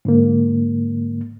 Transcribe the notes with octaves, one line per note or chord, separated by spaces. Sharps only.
G#2 D3 A#3